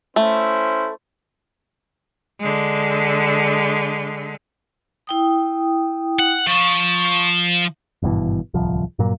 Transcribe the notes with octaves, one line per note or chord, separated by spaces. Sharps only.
A3 C#4 E4 C5
D3 G#3
E4 G5 D#6
F#5
F3 C#6
G#1 G2 B2 E3
D1 C2 F3
G2 A#2 F#3 A#3